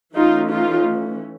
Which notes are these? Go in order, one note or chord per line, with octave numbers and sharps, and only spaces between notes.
E3 A3 C#4 D#4 F4
D#4 F4